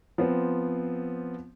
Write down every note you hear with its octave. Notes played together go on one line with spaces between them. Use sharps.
F3 B3 C4